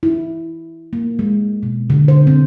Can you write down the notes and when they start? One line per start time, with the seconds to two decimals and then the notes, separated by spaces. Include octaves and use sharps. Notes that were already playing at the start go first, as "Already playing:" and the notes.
0.03 E4
0.93 A#3
1.19 G#3
1.63 B2
1.90 D3
2.08 C5
2.27 C4